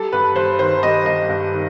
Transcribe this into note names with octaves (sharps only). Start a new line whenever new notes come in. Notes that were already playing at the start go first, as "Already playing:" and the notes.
Already playing: G3 A4
G2 B4
G2 C5
D#3 C5
G3 D#5
G2 D#5
G2
D#3